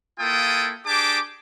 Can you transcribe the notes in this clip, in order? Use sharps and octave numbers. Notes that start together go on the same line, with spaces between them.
A#3 E4 F4 A4 G5 D#6
D4 G4 G#4 A5 D6